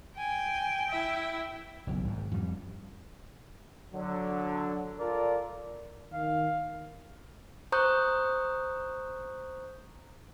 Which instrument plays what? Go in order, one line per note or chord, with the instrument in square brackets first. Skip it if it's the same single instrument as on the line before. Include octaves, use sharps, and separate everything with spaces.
[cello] G5 [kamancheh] G#5
[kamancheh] E4 E5
[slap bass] F#1 B1
G#1 G#2
F2 G3
[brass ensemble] D3 F#3
F4 A4 A#4 D5
[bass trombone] D#3 [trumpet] F5
[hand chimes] C5 A#5 C#6 D#6 F#6 G6